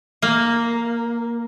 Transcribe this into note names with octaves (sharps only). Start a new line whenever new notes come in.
A#3